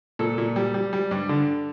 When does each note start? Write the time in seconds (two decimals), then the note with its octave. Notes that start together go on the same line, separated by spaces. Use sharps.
0.19 A#2 A4
0.38 A#2
0.56 G3
0.74 G3
0.93 G3
1.11 G2
1.29 D3